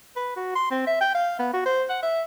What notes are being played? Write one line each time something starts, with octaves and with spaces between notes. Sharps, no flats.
B4
F#4
C6
C4
E5
G5
F5
B3
F#4
C5
F#5
E5